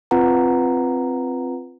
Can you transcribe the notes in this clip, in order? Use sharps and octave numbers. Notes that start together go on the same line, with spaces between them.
C4 F4 B4 F#5 A#5